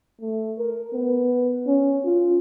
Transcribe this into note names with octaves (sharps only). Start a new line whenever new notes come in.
A3
A#4
B3
C#4
F4